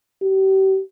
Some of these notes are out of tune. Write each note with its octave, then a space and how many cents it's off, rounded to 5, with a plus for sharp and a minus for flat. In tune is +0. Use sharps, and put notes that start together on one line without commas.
G4 -35